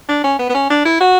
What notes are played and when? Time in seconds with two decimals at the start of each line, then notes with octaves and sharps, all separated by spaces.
0.08 D4
0.24 C#4
0.39 B3
0.50 B3
0.54 C#4
0.70 D4
0.85 E4
1.01 F#4